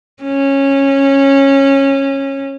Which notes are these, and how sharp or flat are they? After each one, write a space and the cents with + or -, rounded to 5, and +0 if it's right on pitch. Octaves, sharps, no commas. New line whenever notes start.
C#4 -15